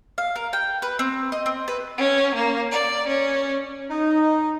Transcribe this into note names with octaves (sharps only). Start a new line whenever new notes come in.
F5
A#4
G5
B4
C4
D#5
C4
B4
C#4
A#3
D5
C#4
D#4